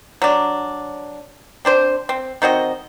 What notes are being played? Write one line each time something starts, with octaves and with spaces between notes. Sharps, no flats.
F#3 D4
C4 D4 C5
C4
D#3 C4 F#4 D#5